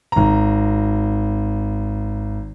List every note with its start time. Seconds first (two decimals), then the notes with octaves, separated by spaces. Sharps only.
0.12 G#1 A#5